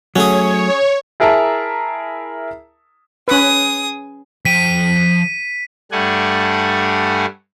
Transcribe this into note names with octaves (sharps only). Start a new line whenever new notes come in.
F#3 A3 C#4 G#4 C#5
E4 G#4 A#4 E5 A5 A#5
C#4 G#4 B4 D#6
F3 G5 B6 D#7
G2 G3 A3 D4 F#5 G#5